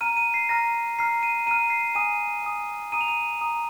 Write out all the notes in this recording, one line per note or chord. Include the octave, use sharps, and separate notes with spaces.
A#5 F6 D#7
D#7
C7
A#5 F6 A#6
A#5 F6 C7
D#7
A#5 F6 D#7
C7
G#5 D#6 D#7
G#5 D#6
A#5 D#6 D#7
F7
D#7
A#5 D#6